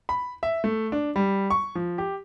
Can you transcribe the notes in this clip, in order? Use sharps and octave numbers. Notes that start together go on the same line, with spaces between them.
B5
E5
A3
D4
G3
C#6
F3
G4